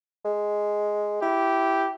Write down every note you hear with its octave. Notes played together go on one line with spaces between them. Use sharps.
G#3
E4 G4